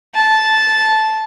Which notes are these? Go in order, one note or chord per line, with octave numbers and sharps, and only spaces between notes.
A5